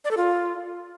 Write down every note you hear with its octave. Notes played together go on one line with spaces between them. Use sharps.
D5
A4
F4